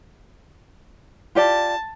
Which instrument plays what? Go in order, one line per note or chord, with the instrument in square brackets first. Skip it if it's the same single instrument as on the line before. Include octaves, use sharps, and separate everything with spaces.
[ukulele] F4 G4 D5 [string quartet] A5